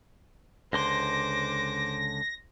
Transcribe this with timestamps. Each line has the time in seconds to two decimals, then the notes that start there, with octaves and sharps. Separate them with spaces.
0.73 C#2 D3 C5 C6 D6 A#6